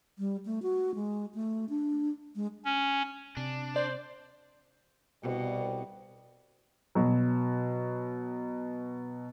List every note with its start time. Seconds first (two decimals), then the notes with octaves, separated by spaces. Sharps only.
0.19 G3
0.46 A3
0.63 F#4
0.95 G#3
1.35 A3
1.69 D4
2.35 G#3
2.65 C#4
3.37 C3 D4
3.76 C5 D5
5.22 C2 B2 G3
6.95 B2 F#3